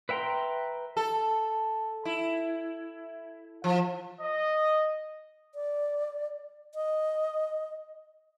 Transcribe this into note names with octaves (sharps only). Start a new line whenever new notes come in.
B4 E5 G5 A#5 C6
A4
E4
F3
D#5
D5
D#5